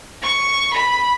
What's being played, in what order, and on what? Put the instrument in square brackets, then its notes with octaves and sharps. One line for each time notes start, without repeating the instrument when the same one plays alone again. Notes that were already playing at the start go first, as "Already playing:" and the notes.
[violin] C#6
B5